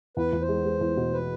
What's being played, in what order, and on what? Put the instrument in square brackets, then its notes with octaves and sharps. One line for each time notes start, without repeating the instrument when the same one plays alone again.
[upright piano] E2 [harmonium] B4
[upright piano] E2
[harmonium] C5
[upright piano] G#3
G#3
E2
B2
[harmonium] B4